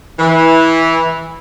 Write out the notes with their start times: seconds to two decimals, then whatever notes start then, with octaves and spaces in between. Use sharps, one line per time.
0.18 E3